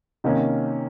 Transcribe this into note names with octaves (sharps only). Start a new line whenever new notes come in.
C3 D#3 A#3 C#4